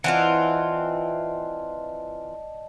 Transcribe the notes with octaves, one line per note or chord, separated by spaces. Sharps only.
E3 C4 F4 D5 D#5 F#5 A5